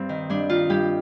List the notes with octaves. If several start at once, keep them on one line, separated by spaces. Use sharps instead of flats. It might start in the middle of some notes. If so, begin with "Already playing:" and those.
Already playing: G2 C4
D#3
G2 D4
D#3 F4
G2 G4